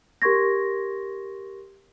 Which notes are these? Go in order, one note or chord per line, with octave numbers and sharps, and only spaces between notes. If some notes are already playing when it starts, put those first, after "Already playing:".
G4 A#4 C6 C#6 G#6 A#6